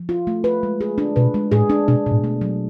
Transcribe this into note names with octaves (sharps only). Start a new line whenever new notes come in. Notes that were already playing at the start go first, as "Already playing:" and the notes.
Already playing: F3
F4
A3
B4
G#3
G#4
D4
B2 B4
G#3
A2 G#4
D4
B2 D4
B2
A2
A3
F#3